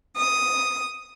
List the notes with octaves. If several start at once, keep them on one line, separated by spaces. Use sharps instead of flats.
D#6